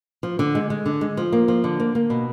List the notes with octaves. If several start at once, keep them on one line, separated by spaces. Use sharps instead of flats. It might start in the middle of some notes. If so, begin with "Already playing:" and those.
F3
D3
G#3
G#3
D3
G#3
F3
A#3
F3
D3
A#3
A#3
B2